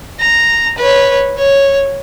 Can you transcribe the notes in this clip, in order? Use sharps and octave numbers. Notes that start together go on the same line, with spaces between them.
A#5
B4 C#5
C#5